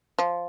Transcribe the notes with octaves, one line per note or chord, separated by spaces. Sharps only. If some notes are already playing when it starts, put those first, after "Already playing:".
F3